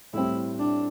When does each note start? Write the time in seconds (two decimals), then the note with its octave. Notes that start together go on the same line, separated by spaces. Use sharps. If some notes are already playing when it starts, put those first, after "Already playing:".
0.13 A2 G3 C4 E4
0.59 D4